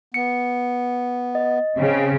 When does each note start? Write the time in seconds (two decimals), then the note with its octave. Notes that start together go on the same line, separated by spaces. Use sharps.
0.14 B3 C#7
1.35 D#5
1.78 C#3 C4